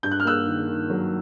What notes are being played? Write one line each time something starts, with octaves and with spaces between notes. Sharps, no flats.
G2 G6
F#6
F6
A#3 E6 F#6
D#3
D#3
F#3